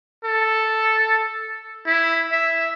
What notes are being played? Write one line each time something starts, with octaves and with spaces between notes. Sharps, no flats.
A4
E4
E5